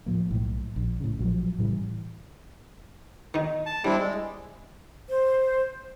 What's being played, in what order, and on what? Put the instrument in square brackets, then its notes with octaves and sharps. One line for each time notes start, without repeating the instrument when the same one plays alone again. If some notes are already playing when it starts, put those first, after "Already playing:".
[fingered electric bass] A2 F3 A#3
B1 A2
A#1
A2 C#3
A#1 F3 F#3
A2 C#3 E3 G3
[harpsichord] D#3 D#4
[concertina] A5
[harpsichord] G3 [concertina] C4 D4 E4
[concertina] G#3
[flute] C5